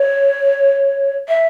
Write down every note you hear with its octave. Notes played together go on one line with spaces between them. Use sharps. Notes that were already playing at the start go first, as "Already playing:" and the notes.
Already playing: C#5
E5